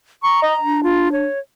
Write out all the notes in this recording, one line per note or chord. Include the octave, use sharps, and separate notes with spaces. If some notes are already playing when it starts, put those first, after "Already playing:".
A#5 C#6
D#5
D4
F4
C#5